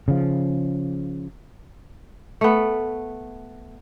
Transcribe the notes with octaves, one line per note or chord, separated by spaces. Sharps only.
C#3 F3
A3 B3